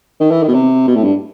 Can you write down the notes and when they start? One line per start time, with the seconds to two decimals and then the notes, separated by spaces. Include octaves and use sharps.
0.20 D#3
0.31 E3
0.43 D#3
0.48 B2
0.54 C3
0.87 B2
0.96 A2
1.04 G2